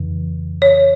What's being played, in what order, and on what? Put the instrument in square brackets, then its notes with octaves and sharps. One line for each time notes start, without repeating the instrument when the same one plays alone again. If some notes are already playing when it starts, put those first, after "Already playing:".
Already playing: [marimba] F2 C#3 E3
C#5